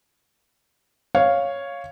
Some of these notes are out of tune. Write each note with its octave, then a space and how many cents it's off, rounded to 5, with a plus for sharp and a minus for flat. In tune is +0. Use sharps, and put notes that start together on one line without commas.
C#5 +0 F5 +0